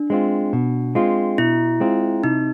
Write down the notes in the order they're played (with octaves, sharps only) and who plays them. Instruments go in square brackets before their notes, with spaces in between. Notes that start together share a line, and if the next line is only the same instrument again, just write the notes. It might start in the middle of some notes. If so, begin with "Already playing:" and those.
Already playing: [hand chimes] D4
[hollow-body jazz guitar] G#3 C4 F4
B2
G#3 C4 F4
[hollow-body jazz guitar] B2 [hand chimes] E4
[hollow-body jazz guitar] G#3 C4 F4
[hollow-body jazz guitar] C3 [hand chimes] D#4